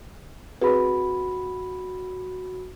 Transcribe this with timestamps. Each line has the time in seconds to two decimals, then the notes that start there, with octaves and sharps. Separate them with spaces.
0.61 C4 F#4 G#4 B4 B5